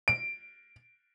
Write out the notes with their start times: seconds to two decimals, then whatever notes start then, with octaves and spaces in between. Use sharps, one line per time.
0.08 D7